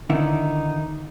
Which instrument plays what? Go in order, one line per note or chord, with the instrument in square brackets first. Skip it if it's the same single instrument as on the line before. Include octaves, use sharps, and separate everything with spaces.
[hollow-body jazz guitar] D3 D#3 E4 [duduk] D#4